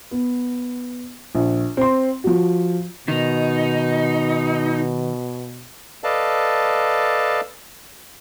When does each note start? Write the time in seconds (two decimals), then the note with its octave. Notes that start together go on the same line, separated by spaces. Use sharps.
0.11 B3
1.35 A#1
1.77 C4 C6
2.24 F3 F#4
3.08 B2 D#3 D#4
6.04 A4 B4 D5 D#5 F5 A5